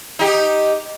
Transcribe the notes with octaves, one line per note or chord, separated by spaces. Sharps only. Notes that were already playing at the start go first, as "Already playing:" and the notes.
D#4 G4